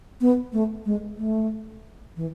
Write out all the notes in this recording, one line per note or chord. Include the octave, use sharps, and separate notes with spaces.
B3
A3
G#3
A3
E3